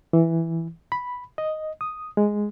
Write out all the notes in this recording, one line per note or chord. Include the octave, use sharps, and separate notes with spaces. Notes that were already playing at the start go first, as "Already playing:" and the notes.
E3
B5
D#5
D#6
G#3